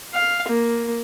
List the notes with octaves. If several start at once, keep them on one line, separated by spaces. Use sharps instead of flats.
F5
A#3